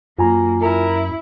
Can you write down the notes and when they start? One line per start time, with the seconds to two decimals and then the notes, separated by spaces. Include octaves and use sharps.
0.18 F#2 A#3 F4 G#5 A#5
0.62 E4 A#4